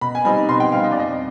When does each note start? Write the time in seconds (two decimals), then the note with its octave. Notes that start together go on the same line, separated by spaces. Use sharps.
0.01 B2 B5
0.15 G#5
0.25 G3 C4 D#4 B5
0.49 B2 C6
0.60 G5
0.72 G3 C4 D#4 F5
0.84 D#5
0.92 D5
0.96 F2 D#5